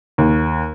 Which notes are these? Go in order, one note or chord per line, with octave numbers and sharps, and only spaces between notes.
D#2